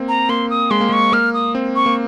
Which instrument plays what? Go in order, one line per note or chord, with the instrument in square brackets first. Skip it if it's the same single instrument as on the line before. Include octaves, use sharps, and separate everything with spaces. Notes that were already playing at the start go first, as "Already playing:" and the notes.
Already playing: [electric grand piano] A#3 C4
[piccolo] A#5
[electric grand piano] A#3 [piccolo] C6
[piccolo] D#6
[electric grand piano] G#3 [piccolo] C6
[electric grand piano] A#3
[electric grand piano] G#3 [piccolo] C#6
[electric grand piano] A#3 [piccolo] F6
[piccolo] D#6
[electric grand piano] C4
[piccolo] C#6
[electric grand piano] A#3